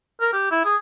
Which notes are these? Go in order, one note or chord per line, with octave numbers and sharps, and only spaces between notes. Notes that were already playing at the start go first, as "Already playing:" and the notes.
A#4
G4
E4
G#4